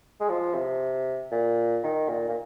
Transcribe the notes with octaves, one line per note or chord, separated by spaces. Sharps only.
G#3
F3
C3
A#2
D#3
A#2
A#2